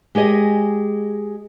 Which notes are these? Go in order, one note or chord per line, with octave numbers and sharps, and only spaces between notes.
G#3 G4 G#4 D#5